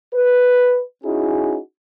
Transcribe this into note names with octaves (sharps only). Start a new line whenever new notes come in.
B4
C#4 D#4 E4 F#4 G#4